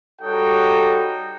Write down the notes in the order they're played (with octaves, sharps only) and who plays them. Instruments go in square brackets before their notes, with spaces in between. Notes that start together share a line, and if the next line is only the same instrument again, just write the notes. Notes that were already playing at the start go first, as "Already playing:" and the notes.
[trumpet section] G3 D#4 F#4 A4 C#5 G5